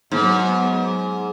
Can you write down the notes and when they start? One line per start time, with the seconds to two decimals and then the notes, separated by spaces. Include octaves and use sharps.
0.12 G#2 F#3 B3